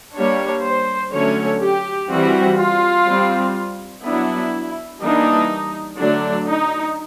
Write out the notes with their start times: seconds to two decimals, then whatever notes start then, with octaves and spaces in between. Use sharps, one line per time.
0.15 G3 A#3 D4 C#5
0.63 C5
1.12 D3 F#3 A3 C#4 C#5
1.62 G4
2.10 E3 G3 C4 F#4
2.58 F4
3.07 G3 C4
4.04 F#3 B3 D4 E4
5.02 E3 G3 A#3 D4 D#4
5.98 D3 F#3 A3 D4
6.48 D#4